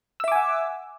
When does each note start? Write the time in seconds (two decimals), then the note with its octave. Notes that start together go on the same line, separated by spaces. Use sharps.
0.20 E6
0.24 E5
0.28 D6
0.32 G#5
0.36 F#5